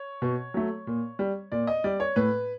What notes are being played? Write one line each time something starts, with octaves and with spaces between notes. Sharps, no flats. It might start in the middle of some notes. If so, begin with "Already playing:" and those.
Already playing: C#5
B2
F#3 A3
A#2
G3
A#2 D5
D#5
G3 D5
C#5
A2 B4